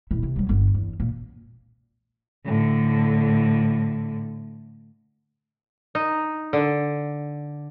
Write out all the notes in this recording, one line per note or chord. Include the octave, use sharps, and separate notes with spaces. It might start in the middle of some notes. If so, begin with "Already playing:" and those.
D#1 E4
C3
F#3 G3
G1 B3
E2
A#2
A2 D3
D#4
D3